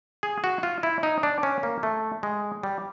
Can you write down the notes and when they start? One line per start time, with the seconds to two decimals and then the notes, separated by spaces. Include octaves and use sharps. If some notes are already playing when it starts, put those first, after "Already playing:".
0.23 G#4
0.44 F#4
0.63 F4
0.83 E4
1.03 D#4
1.23 D4
1.43 C#4
1.63 A#3
1.83 A3
2.23 G#3
2.63 G3